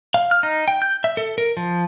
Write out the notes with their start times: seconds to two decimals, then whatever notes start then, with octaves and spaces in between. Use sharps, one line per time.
0.14 F5
0.31 F6
0.43 D#4
0.68 G5
0.82 G6
1.04 E5
1.17 A4
1.38 A#4
1.57 F3